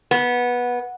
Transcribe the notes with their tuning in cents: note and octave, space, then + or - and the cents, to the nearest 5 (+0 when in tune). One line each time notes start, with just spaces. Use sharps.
B3 -15